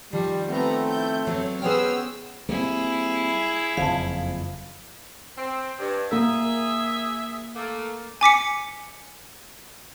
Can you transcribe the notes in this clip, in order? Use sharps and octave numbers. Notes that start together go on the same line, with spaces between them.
D#3 F3 G3
A3 B3 C4 A#5
E4 G6
F#3 B3 C4 C#5
B3 C#4 G#4 C5 G5 E6 F6
G3 A#3 C4 E4 G#4
F#1 F2 F3 F5 A5
C4
G2
A#3 G#4 A#4 E5
A3 A#3
G#5 D6 B6 C#7